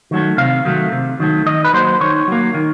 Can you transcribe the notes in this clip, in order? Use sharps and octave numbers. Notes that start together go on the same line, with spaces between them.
D#3 F#3 A3
C3 F5
D#3 F#3 A3
C3
D#3 F#3 A3
D#3 D#5
B4
F#3 A#3 C5
D#3 C#5
F#3 A#3
D#3